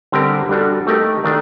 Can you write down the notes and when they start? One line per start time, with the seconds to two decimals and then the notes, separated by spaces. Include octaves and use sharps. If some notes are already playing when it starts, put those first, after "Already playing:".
0.12 D3 G3 C4 G4 A#4
0.49 G3 D4 F#4 A4
0.87 A3 D#4 G4 A#4
1.24 D#3 A3 D4